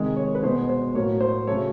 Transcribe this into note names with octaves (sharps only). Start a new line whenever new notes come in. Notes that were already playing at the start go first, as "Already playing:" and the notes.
Already playing: C3 D#3 G#3
C#5
B4
B2 G#3 B3 C5
C5
A2 F#3 A#3 C#5
C5
C#3 F#3 A3 C#5